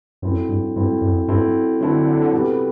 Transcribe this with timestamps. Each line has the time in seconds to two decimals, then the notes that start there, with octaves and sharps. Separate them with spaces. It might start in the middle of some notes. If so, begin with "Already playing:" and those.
0.22 F#2 F#3 C4 E4 A4
0.49 G2
0.76 G2 F#3 C4 E4 A4
1.01 F#2
1.28 G2 F#3 C4 E4 A4
1.80 D3 F#3 C4 E4 A4
2.32 C3 G3 B3 F#4 A4